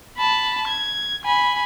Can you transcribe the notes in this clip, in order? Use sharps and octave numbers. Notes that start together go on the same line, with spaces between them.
A5 B5
G#6
G#5 B5